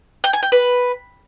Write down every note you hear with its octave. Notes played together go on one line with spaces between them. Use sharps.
G5
G#5
G5
B4